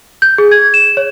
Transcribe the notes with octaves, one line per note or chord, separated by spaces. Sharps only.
G6
G#4
G#6
E7
C#5